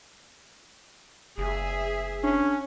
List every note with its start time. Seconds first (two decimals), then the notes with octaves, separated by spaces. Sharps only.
1.38 F#1 G#4 E5
2.23 C#4 D4